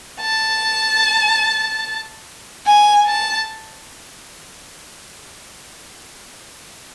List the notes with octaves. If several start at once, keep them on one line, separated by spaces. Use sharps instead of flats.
A5
G#5
A5